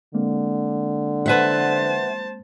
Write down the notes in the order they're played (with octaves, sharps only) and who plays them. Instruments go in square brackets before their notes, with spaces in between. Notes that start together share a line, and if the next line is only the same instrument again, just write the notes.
[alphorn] D3 [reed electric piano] G#3 A#3 C4
[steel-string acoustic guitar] B4 E5 F#5 [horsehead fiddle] C5 A5